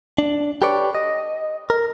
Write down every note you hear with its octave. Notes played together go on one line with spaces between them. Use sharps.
D4
G4 A4 B4 C#5 D5
D#5
A#4